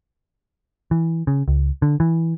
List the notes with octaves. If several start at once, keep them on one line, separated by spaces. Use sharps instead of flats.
E3
C#3
C#2
D3
E3